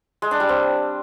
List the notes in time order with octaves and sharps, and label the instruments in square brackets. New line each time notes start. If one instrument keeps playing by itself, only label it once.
[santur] G#3
D4
G3
C4